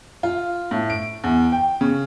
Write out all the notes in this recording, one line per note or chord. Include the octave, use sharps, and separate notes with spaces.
F4
A2
D7
E2
G5
C#3